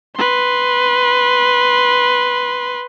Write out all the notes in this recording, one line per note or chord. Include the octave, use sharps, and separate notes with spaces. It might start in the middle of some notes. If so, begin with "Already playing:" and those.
B4 C6